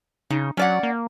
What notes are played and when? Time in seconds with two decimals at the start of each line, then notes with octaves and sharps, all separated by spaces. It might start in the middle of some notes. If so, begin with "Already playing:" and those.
0.30 C#3 D#4
0.57 F#3 C#4 D5 F#5
0.83 A#3